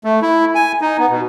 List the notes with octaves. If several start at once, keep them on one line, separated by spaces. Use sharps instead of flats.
A3
E4
G#5
D#4
B3
B2